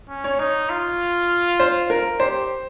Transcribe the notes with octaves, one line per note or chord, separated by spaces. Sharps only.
C#4
C#5
D#4 C#5
F4
C5
A#4
G4 C5